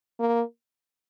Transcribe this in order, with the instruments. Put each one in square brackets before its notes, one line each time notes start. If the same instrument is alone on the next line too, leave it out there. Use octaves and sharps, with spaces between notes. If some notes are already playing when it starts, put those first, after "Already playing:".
[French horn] A#3